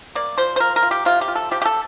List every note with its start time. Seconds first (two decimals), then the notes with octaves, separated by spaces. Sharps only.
0.15 A#3 D5
0.38 F3 C5
0.56 C5
0.60 F4 A#4
0.76 A#4
0.83 F4
0.91 G4
1.05 C3 F4
1.21 G4
1.28 F4
1.35 A4
1.51 F3 G4
1.62 G4
1.65 A4